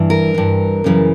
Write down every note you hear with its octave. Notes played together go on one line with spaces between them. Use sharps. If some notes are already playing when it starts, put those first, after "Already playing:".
Already playing: G2 E3
A#4
G2 E3
F#2 C#3 E3